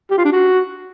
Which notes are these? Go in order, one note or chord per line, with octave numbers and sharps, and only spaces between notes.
G4
F4
D4
F#4